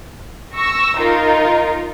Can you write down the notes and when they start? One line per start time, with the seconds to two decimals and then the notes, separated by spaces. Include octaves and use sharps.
0.54 C#6 E6 A#6
0.97 D#4 F4 A#4